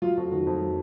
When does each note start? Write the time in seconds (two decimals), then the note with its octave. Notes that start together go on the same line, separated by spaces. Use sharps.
0.02 F#3 F4
0.17 F2 F#4
0.32 D#3 F#4
0.47 F2
0.62 F#3